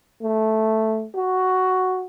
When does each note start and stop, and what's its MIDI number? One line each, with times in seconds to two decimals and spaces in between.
0.22 1.06 57
1.16 2.05 66